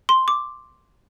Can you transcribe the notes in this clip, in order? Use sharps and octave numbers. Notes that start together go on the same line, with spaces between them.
C6
D6